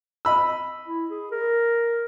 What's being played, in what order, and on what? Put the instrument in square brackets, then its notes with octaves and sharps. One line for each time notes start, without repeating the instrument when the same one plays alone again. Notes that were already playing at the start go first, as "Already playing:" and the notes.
[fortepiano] D#5 B5 E6
[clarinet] E4
G#4
A#4